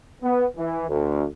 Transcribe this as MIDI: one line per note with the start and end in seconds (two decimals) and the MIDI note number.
0.22 0.44 59
0.56 0.84 52
0.89 1.25 38